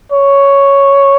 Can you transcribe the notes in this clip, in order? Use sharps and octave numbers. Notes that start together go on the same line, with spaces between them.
C#5